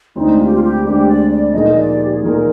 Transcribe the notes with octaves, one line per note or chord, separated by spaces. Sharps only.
D2 D3 G#3 C4 D#4
F4
G4
F4
G4
D2 D3 G#3 C4 G4
D5
D5
A#2 F3 A#3 D#4 G#4 D#5
D5
G4
G#4
A#2 F3 A#3 D#4 G#4 A#4